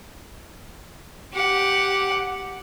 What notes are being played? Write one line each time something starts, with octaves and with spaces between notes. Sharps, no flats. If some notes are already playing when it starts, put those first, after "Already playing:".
G4 F#5